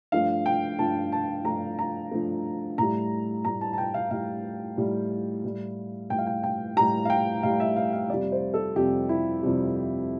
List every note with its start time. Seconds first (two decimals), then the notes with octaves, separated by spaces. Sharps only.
0.12 G2 F3 A3 F5
0.46 G5
0.79 G2 F3 A3 A5
1.12 A5
1.45 G2 F3 A3 A#5
1.79 A#5
2.11 G2 F3 A3
2.78 A2 G3 A#5
3.45 A2 G3 A#5
3.61 A5
3.73 A5
3.78 G5
3.94 F5
4.11 A2 G3 F5
4.77 A2 G3
5.44 A2 G3
6.10 A2 G3 G5
6.18 F5
6.27 G5
6.43 G5
6.76 A2 G3 A#5
7.05 F5
7.10 G5
7.43 A2 G3 F5
7.60 E5
7.76 F5
7.93 F5
8.10 F2 C3 G3 D5
8.32 C5
8.54 A4
8.76 F2 C3 G3 G4
9.09 E4
9.43 F2 C3 G3